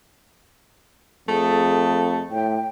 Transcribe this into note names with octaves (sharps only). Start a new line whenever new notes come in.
F2 A3 G#4
A2 G5